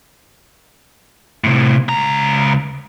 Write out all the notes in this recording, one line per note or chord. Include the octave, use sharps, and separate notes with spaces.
A2 C3
C#2 A#5